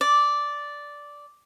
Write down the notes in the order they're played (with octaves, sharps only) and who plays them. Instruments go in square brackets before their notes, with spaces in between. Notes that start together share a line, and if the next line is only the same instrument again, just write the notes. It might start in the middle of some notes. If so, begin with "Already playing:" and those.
[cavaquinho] D5